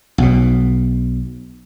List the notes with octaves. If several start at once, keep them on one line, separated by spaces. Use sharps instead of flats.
B1 B2